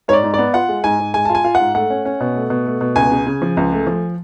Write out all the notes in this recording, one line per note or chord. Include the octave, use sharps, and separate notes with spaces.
G#2 C#5 D5
G#2
B3 D5
F4 F#5
G#3
G#2 G#5
G#2
G#3 G#5
F4 A5
G#5
F4
F#5
G#2
A3 F#5
C#4
C#4
B2
A3
B2
A3
B2
C#2 G#5
C#3
C#3
F3
C#2
A3
F3